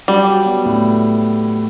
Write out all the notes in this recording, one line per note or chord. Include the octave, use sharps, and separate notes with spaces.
F#3 G3
F#4
B3
A2